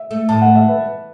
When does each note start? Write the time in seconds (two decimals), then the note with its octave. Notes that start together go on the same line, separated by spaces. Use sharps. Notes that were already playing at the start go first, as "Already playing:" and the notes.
Already playing: E5
0.11 A3
0.29 A2 A5
0.42 F#5
0.55 E5
0.68 B4